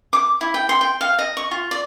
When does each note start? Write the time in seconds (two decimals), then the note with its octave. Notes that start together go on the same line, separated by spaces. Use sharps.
0.13 D6
0.41 E4
0.54 G5
0.69 C6
0.81 G5
1.01 F5
1.19 D#5
1.37 C#6
1.51 F4
1.71 D5